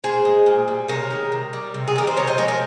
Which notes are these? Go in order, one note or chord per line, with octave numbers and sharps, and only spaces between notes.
A#2 G#4 C5
G#3
A#2
G3
C3 A#4 C#5
D#3 G#3
C3
G3
C3
G#4
D#3 G3 A#4
C5
C3 A#4 C#5
C5 D#5
F3 G#3 A#4 C#5
A#4 C#5